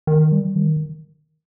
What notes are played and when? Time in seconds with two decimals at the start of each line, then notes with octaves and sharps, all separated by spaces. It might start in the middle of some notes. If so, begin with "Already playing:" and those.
0.07 D#3
0.32 G3
0.56 D#3